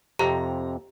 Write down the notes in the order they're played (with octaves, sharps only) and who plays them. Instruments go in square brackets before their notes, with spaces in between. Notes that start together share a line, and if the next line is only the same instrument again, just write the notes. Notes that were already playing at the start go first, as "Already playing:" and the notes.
[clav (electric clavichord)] F2 C3 [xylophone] G4 [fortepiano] A#5